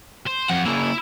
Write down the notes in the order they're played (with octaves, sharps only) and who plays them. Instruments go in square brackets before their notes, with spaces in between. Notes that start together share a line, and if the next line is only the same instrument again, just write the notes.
[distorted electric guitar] C5
[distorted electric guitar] F2 [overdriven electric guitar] F#5
[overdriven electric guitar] C#3 A#3 [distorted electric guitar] E4